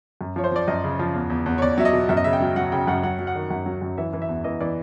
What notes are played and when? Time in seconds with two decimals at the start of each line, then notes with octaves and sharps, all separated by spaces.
0.21 F#2
0.36 F3 C#5
0.44 C5
0.52 F3 D5
0.68 F#2 D#5
0.84 C#3
0.99 F3
1.15 E2
1.30 E2
1.46 E2
1.58 C#5
1.62 E2 D5
1.78 F#3 E5
1.85 D#5
1.93 B2
2.09 F#2 E5
2.17 D#5
2.24 C#3 E5
2.33 G5
2.41 F#3
2.56 F#3 F#5
2.72 C#3 G5
2.87 F#2 F#5
3.03 F#3 F#5
3.19 F#3
3.27 F#5
3.35 D#3
3.50 F#2 F#5
3.66 F#3
3.82 F#2
3.98 E3 E5
4.13 E3
4.22 E5
4.29 E2
4.44 E3 D#5
4.61 E3 D5